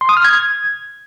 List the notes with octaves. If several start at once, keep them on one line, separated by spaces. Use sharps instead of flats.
C6
D#6
F6
G#6